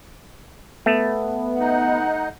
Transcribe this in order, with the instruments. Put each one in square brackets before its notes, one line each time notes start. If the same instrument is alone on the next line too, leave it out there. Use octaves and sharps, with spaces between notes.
[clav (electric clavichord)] A3 [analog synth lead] B3
[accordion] D#4 [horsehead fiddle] F#5